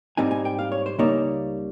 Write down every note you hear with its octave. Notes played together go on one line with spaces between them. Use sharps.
G#2 G3 C4 D#4 G#5
G#5
G5
F5
C#5
C5
C#2 C#3 G3 A#3 D#4 C#5